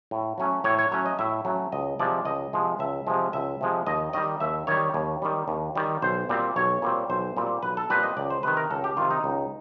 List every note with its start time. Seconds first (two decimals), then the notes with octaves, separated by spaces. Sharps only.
0.11 A2
0.38 F#3 A3 C#4
0.64 A2 C#5
0.79 C#5
0.92 F#3 A3 C#4 C#5
1.06 D#5
1.19 A2 E5
1.45 F#3 A3 C#4
1.72 C#2 D#5
1.99 C3 F3 G#3 D5
2.25 C#2 D#5
2.53 C3 F3 G#3
2.79 C#2 E5
3.07 C3 F3 G#3
3.33 C#2 E5
3.61 C3 F3 G#3
3.87 D#2 D#5
4.13 D#3 G3 D#5
4.40 D#2 E5
4.67 D#3 G3 C#5
4.94 D#2
5.22 D#3 G3
5.48 D#2
5.75 D#3 G3
6.02 B1 C5
6.29 A#2 G3 C4
6.56 B1 C#5
6.82 A#2 G3 C4
7.10 B1 C5
7.37 A#2 G3 C4
7.63 B1 B4
7.77 A4
7.90 A#2 G3 C4 B4
8.03 D#5
8.17 C#2 D5
8.30 C5
8.43 C3 D#3 B4
8.57 A#4
8.71 C#2 A4
8.84 G4
8.97 C3 D#3 F4
9.11 D#4
9.24 C#2